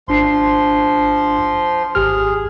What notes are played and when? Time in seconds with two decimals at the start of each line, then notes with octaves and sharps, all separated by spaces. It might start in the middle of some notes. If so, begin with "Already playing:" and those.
0.08 G#1 F3 D4 C6 C7
1.95 G#1 G4 G#4 F6